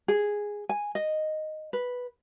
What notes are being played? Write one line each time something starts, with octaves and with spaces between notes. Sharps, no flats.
G#4
G#5
D#5
B4